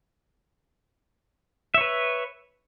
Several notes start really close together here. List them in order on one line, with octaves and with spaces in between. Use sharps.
E5 C#5 B4